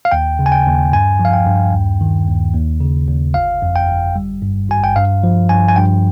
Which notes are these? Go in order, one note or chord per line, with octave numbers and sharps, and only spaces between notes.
F5
D#2 G5
C#3
G#5
G5
D#2
G2 G#5
F3
F5
G5
G2
D#2
D#3
D#2
D#2
C#3
D#2
G1 F5
F2
G5
G1
G3
G2
G#1 G#5
G5
G2 F5
F3
G2 G#5
G#5
G2 G5